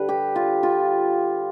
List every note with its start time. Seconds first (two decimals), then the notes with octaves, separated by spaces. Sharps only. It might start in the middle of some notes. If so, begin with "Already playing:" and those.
Already playing: D3 G3 B4
0.09 G4
0.36 F4
0.63 F4